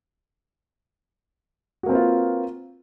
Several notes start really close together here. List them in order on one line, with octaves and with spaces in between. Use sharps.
F#4 A#3 C4 B4 F4